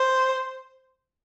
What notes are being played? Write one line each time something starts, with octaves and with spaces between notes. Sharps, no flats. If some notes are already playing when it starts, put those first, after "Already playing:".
Already playing: C5